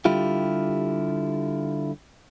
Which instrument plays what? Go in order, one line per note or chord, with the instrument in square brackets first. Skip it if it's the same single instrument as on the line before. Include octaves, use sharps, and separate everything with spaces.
[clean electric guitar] D3 G3 E4 F4 G4